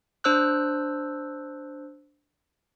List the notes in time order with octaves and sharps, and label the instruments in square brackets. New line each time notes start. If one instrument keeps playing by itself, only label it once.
[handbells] D4 C5 E6 F#6